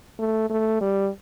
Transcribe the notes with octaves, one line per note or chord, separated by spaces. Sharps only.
A3
A3
G3